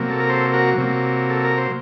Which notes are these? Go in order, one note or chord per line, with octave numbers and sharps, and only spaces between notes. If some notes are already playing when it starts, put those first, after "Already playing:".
Already playing: C3 F#3 A#3
A4
A#4
A4 C5
F#4 A#4
C3 F#3 A#3
A4
A#4
C5